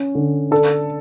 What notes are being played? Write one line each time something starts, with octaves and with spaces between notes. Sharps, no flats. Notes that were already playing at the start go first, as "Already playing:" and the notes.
Already playing: C#4
D3
D4 A4